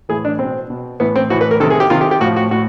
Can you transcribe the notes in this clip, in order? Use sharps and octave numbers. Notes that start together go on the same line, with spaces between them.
A2 E3 G#4
D4
B2 C4
B2
A2 E3 B3
C4
A2 E3 F#4
B4
A#4
C3 D#3 A4
G#4
G4
C3 D#3 F4
G4
G4
A2 F3 F#4
F#4
A2 F#4